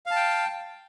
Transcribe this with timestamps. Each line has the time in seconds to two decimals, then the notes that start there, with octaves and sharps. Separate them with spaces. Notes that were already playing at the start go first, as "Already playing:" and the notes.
0.06 F5
0.11 A5
0.16 G5